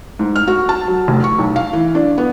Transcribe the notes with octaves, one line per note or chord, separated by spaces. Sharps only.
G#2
F6
F#4
A5
F#3
F1
C#6
B1
F5
E3
D4
B3